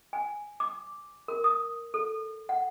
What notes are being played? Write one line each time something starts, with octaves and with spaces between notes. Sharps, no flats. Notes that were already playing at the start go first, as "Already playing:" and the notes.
G#5
D6
A#4
D#6
A4
F#5